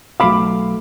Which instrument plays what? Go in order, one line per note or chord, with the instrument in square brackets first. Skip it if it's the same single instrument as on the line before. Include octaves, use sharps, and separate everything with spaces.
[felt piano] B1 A3 D6 [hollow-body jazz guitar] F5 B5